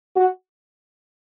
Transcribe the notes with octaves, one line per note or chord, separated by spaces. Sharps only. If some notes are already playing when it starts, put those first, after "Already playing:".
F#4